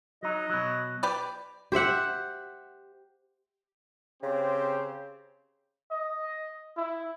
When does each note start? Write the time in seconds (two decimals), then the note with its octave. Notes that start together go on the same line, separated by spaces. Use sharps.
0.23 F#3 D#4 D#5
0.50 B2 F#3
1.03 G4 B4 D5
1.72 G4 C5 E5 F#5
4.23 C#3 C4 G4 C5
5.91 D#5
6.77 E4